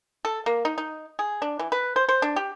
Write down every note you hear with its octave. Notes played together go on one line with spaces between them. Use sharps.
A4
A#3
D#4
D#4
G#4
D4
E3
B4
C5
C5
D4
G4